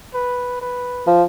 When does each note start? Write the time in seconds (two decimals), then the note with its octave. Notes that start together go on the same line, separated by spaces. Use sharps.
0.14 B4
0.61 B4
1.07 F3